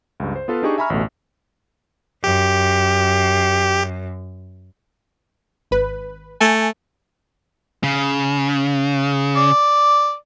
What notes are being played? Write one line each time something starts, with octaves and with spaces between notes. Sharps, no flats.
C#2 G2
C5
B3 F4 A4 B4 F5
D4 D#4 G4 G#4 D#5 C#6
E5 G#5 A#5 B5 C#6 F6
A1 D2 B2 A3
F#2 G4
G#1 B4
A3 G#5
C#3
D5